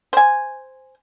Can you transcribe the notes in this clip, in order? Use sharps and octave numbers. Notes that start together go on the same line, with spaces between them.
C5 G#5